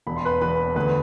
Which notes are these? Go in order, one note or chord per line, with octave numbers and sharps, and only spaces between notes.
E1 B5
C6
B4 B5
E2 B4 B5
D2 B4 B5